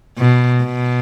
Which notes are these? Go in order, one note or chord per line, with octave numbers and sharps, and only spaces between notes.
B2
B2